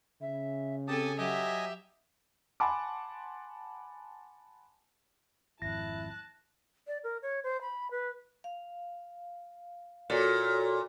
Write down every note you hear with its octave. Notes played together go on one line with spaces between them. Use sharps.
C#3 E5
C4 G4 A4 G#5 A5 D#6
F#3 G4 D#5 E5 G#5 D#6
F#5 G#5 A5 B5 C6 D6
G#1 F2 E4 A5 F#6 A#6
D5
A#4
C#5
C5
B5
B4
F5
A#2 F#4 A4 C#5